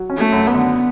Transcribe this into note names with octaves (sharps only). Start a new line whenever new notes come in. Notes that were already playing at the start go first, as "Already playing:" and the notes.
Already playing: F#3
C#4
A3
F#2
B3
D3